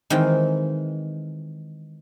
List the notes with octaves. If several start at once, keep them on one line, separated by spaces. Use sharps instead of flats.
D#3 E3 G#3 C4